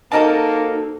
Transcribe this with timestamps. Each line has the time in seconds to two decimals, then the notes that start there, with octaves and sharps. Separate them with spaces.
0.12 A#3 C4 D#4 F#4 A4 A#4 D#5 A5